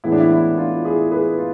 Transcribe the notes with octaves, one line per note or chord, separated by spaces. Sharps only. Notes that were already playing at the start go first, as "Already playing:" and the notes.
A2 E3 G#3 B3 E4
D4
E4
E4
D4 F4
E4 G#4
G#4 B4
F4